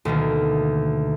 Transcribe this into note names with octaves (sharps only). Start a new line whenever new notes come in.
D2 B2 D#3 A#3